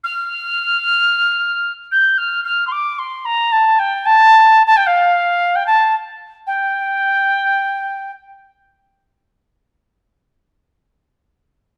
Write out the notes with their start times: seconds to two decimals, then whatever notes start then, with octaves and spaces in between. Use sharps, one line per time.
0.04 F6
1.91 G6
2.18 F6
2.45 F6
2.67 C6
2.72 D6
2.99 C6
3.25 A#5
3.52 A5
3.79 G5
4.06 A5
4.67 A5
4.77 G5
4.87 F5
5.56 G5
5.66 A5
6.47 G5